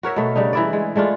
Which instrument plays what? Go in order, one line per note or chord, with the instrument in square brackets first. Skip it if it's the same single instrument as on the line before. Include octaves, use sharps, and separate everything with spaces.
[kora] F#4 A#4 C#5 E5
B2 A3
C#3 G3 D4 D#4
E3 E4 D5
G#3
G#3 A3 D4 F4